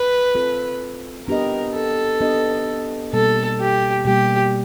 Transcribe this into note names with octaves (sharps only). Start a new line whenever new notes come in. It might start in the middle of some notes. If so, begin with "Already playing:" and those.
Already playing: B4
C4 F4 A4
B3 D4 G4 A#4 B4 D#5
A4
B3 D4 G4 B4 D#5
B2 G3 A#3 A4
G4
B2 G3 A#3 G4